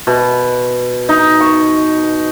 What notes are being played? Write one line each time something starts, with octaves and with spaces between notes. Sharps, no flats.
B2
D#4
C#6